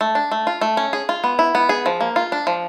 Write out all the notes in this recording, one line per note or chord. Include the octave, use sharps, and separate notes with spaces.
A3
D4
A3
F4
A3
C#4
G#4
F4
B3
E4
B3
G#4
F3
A#3
F4
D4
F3